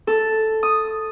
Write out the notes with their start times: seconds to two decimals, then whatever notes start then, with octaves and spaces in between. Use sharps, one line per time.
0.07 A4
0.63 D#6